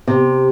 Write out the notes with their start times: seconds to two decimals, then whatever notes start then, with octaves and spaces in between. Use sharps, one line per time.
0.07 C3